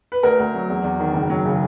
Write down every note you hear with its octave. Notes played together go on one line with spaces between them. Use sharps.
B4
D2 A#4
D2
F#3
E2
E2
D#3
F#1
F#3
C#3